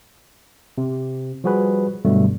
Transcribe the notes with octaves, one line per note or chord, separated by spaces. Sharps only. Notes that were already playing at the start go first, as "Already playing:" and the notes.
C3
F3 G3 F#4 G#4 B4
G2 B2 D3 F#3 G3 A3